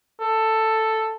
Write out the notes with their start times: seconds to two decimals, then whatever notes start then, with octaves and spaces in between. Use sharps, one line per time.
0.20 A4